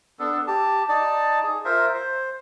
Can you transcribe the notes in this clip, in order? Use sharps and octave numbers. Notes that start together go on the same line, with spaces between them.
B3 D4 A4
G4 A5
D#4 D5 A5
G#4
F4 A#4 C5 E5
C5